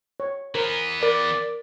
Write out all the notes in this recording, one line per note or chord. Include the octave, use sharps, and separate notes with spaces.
C#5
E3 B3 A#4 C5
A#4 D5 B5